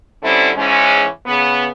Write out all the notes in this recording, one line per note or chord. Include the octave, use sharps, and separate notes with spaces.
D3 G3 C4 C#4 E4
G#2 E3 G#3 C#4
C#3 B3